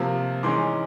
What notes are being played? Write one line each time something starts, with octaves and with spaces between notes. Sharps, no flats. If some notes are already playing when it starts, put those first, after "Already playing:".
Already playing: C3 F3 A#3
G#2 E3 G#3 C#4 C6 D6